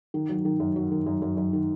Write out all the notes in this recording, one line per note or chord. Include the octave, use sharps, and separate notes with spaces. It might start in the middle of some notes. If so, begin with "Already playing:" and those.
D#3
F#3
D#3
F#2
F#3
D#3
F#2
F#2
F#2
D#3